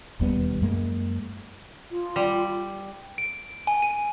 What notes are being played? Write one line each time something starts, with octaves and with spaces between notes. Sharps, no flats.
E1 D#2 G3 B3
F#2 G#3 A#3
F4
G3
D7
G#5
D#7